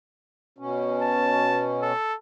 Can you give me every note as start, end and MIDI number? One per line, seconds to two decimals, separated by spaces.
0.58 1.92 47
0.58 1.92 61
1.02 1.69 81
1.82 2.15 69